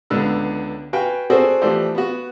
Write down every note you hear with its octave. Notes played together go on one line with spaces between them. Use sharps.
C#2 D3 B3 D4 E6
F#4 B4 F5 G5 G#5
C4 F#4 G#4 A4 C5 D5
E3 F3 A3 G4 C5 D5
B3 F#4